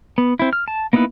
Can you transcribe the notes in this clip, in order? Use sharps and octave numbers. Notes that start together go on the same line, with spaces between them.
B3
C4 E4
F6
A5
A#3 B3 D#4 E4 B4